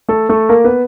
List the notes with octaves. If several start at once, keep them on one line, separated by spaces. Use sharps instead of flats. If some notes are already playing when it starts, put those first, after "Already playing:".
A3 A4
A3 A4
A#3 A#4
B3 B4